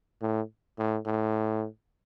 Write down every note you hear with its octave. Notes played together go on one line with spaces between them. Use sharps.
A2
A2
A2